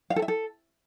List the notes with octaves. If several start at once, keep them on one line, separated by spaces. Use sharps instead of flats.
F5
A4
E5
A4